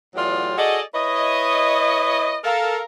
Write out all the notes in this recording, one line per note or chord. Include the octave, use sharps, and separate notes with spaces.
E2 A2 F#3 F4 G4 D5
F#4 G#4 A4 D5 D#5
E4 B4 C#5 D#5
A4 A#4 F5